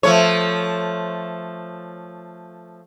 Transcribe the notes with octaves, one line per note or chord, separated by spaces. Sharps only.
F3 A3 C#5